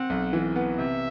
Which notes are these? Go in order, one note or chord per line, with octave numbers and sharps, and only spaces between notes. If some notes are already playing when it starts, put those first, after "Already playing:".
Already playing: C4 F#5
B1
E3
B3
C3 E5